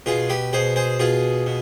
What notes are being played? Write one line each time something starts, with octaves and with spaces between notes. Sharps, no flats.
B2 F4 G#4
G4 B4
B2 G#4 C5
G#4 C5
B2 F4 G#4
B2